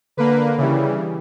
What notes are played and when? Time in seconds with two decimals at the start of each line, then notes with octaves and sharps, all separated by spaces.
0.17 D3 A#3 B4
0.58 C#3 E3 G3